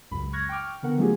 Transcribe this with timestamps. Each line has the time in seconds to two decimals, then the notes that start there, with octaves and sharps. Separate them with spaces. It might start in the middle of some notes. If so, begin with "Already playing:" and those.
0.11 C#2 F#2 B5
0.33 C#6 F6 F#6 G#6 A#6
0.49 G5 C#6 D6 F6
0.83 D3 B3 A#4 F#5
0.98 F#3 A3 C#4 F4 G4 G#4